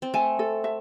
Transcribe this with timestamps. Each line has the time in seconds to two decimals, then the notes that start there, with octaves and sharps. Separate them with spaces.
0.02 C4
0.14 A3 G#5
0.39 A4
0.64 E5